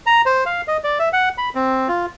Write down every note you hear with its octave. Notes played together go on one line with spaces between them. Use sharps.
A#5
C5
F5
D#5
D5
E5
F#5
B5
C4
F4